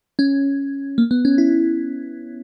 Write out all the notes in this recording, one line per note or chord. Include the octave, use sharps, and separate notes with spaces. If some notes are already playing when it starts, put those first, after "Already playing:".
C#4
A#3
B3
C#4
E4